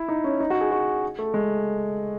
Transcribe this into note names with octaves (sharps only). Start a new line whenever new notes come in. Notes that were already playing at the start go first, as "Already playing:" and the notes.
Already playing: E4
D#4
C#4
D#4
F#4
G#4
F#4
A3
G#3